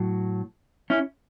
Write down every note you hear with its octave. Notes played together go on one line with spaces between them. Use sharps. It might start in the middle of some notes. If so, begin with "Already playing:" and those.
Already playing: A2 F#3
C#4 E4